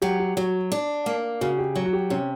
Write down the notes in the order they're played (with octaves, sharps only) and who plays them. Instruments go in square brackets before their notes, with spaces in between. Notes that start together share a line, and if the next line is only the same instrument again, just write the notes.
[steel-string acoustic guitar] F#3 [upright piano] G4
[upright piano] G4
[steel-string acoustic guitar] F#3 [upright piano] F#4
[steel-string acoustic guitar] D4
A#3
[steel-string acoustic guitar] C#3 [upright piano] F#4
[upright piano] G4
[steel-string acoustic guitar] F#3 [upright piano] F#4
[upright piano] F#4
G4
[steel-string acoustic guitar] C3 [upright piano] C#4